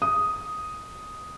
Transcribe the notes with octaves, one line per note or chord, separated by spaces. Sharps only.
D#6